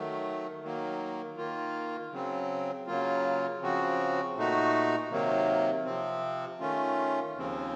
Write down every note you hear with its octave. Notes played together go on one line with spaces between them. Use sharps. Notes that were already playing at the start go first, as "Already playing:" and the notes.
Already playing: D#3 F#3 A3
D#3 F#3 A#3
D#3 A#3 F4
C#3 F#3 C4
C#3 F#3 A#3 F4
C#3 F3 C4 F#4
A#2 A3 D#4 F#4
C3 D#3 F#3 A#3
C3 F3 C4
D#3 A3 C#4 F4
D#2 C#3 F3 C4